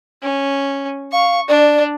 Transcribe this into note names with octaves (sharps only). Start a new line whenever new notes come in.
C#4
F5 C#6
D4 D5